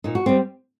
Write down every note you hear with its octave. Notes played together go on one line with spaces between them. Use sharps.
A#2 D#4
F#4
G3 C4